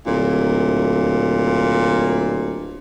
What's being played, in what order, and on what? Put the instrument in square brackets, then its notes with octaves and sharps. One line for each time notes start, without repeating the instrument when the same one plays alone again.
[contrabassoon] D1 [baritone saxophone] A#2